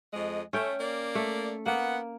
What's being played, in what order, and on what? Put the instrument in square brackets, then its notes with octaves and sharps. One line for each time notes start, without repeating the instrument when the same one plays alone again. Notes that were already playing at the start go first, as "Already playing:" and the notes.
[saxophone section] F2 G#3 D#5
[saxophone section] A3 [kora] C#4 G5
[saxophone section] A#3 D5
[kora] A3
[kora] A#3 [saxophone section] B3 F#5